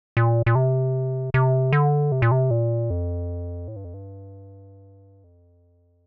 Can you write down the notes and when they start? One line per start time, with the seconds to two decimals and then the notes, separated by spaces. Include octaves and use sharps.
0.17 A#2
0.46 A#2
0.55 C3
1.34 C3
1.72 D3
2.12 C3
2.22 A#2
2.31 C3
2.51 A#2
2.90 F2
3.68 A2
3.76 G2
3.85 F2
3.94 G2
5.24 F2